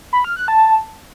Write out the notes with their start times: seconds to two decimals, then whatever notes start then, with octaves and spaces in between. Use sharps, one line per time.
0.13 B5
0.25 F6
0.36 F#6
0.48 A5